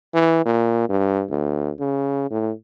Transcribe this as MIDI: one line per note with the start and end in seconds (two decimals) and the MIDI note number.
0.14 0.43 52
0.45 0.86 46
0.89 1.24 43
1.30 1.70 38
1.80 2.28 49
2.30 2.51 45